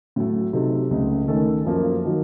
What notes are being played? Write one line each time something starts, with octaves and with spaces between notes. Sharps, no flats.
A2 F#3 A3
C3 F#3 C4 D#4 A4
C#2 C#3 A3
D#3 A3 C#4 A4
F#2 F3 A#3
D#3 F#3